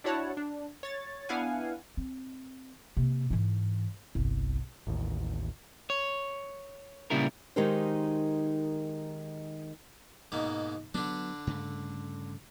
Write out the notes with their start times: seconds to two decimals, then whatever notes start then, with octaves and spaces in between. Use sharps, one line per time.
0.04 D4 E4 F#4 C#5 F#5 A5
0.37 D4
0.83 C#5 A6
1.29 B3 D4 E4 F5 F#5 G#5
1.97 C4
2.97 C3 A#3
3.30 G#2 E3
4.15 G1 C2
4.87 A1 D#2
5.90 C#5
7.10 A#2 C#3 G3 E4 A#4
7.56 D#3 G#3 D#4 G4 A#4 C5
10.32 G#2 B2 A#3
10.94 D3 F#3 B3 D4
11.47 G2 C#3 A3